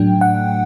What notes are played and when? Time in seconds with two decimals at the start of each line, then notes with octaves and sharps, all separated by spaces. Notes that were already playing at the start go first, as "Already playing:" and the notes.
Already playing: A2 F#3 A3 D4 G5
0.21 F#5